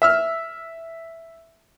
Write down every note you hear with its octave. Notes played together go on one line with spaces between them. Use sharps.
E5 E6 F6